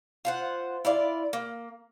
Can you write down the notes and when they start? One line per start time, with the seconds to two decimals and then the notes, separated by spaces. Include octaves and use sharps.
0.25 F4 C5 F#5
0.85 E4 F4 D5
1.33 A#3